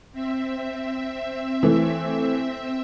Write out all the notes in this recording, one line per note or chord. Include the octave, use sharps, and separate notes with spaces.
C4 E5
E3 A3